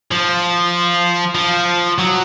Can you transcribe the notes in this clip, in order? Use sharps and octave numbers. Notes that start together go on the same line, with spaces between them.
F3
F3
F#3